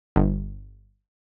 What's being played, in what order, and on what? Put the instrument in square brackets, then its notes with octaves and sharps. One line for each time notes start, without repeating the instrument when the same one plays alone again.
[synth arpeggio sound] G1